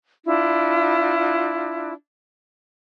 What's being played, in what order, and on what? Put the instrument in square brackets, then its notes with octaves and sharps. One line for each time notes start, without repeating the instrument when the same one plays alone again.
[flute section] D4 E4 F4